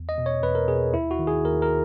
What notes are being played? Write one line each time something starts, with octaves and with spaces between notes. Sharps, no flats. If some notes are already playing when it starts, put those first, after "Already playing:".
Already playing: E2
D#5
B2
C#5
E2 B4
A#4
B2 G#4
D#2 E4
F#4
D#3
G#4
D#2 A#4
A#4